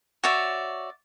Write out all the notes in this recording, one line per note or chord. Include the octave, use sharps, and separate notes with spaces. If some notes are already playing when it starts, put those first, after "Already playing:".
F#4 C#5 D5 E5